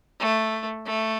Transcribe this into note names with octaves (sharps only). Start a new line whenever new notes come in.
A3
A3